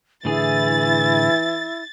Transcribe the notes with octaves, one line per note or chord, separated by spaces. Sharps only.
A2 D3 E3 E4 G#4 A6